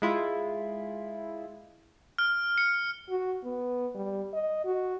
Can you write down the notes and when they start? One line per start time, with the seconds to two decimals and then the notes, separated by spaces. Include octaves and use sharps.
0.02 G#3 E4 F4
2.18 F6
2.58 C#7
3.09 F#4
3.44 B3
3.95 G3
4.33 D#5
4.65 F#4